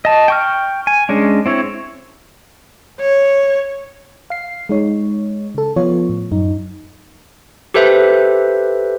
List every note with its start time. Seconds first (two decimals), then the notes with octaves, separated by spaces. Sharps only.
0.05 D#5 A5
0.28 G5 C#6 F6
0.87 G#5
1.09 G#3 C#4 D4
1.46 C4 E4 C#5
3.00 C#5
4.30 F5 C7
4.69 G#3 D#4 C#5
5.55 C#3 A4
5.76 F3 B3 F4 C#5
6.09 A2
6.32 F#2 D#4
7.74 G4 A4 B4 C5 E5